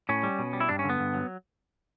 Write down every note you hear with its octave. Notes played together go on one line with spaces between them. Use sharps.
A2 C#4
G3
B2
G3
E4
G2 D4
C#4
D3
B3
G2
F#3